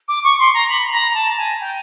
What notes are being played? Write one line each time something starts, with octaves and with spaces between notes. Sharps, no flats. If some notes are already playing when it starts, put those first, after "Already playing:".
D6
C#6
C6
A#5
B5
A#5
A5
G#5
G5